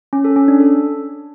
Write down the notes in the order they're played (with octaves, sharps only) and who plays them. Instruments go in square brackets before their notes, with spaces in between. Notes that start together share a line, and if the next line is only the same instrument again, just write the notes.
[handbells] C#4
A4
C#4
D4
A4